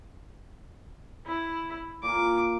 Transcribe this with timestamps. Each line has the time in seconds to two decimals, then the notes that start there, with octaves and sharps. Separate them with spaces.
1.26 E4
2.03 A#2 A#4 G#5 D6